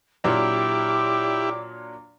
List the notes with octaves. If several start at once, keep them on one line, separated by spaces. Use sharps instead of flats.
A#2 F#3 D4 E4 G4 D6